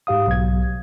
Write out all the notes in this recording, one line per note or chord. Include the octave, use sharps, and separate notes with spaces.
G#2 G4 F5 D#6
B1 G#6